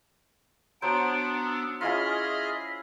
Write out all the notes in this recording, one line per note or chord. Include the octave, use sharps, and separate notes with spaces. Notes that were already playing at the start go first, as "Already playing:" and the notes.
F#3 B3 D4 C5 D7
E6
C#4 E4 F4 G#4 D#5 F6 B6